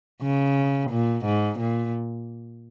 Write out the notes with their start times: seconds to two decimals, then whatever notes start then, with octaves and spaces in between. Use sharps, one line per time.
0.22 C#3
0.90 A#2
1.25 G#2
1.59 A#2